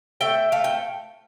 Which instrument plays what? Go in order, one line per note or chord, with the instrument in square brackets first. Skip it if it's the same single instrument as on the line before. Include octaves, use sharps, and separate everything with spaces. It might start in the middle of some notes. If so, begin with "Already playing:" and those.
[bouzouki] A3 E5 G5
A3 F5
G5